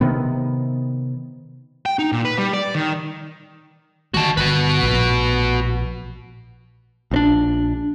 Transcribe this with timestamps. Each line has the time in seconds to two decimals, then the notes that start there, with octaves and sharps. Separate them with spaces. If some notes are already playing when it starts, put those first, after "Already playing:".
0.01 C3 D#3 B3
1.86 G5
1.99 D#4
2.12 A#2
2.25 B4
2.38 G3
2.54 D5
2.75 D#3
4.14 D3 D#3 A3 F#4 A5
4.37 G1 F#4 B4
4.83 A#1 A2 F3
7.11 A#1 C4 D4